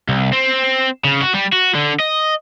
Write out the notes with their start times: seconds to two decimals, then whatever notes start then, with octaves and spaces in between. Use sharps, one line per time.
0.09 C2
0.33 C4
1.04 C#3
1.21 F#4
1.34 G3
1.53 F#4
1.75 D3
2.00 D#5